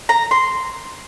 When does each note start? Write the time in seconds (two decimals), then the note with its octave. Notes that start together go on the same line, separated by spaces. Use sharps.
0.09 A#5
0.31 C6